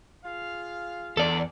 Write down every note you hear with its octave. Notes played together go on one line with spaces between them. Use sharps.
F4 G#4 F5
E2 A4 D5